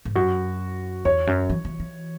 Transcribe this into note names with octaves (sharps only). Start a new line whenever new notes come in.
G#2
F#2 F#4
E2 C#5
F#2
E3
E3
E3